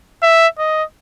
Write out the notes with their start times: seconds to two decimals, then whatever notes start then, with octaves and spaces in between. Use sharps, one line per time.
0.23 E5
0.59 D#5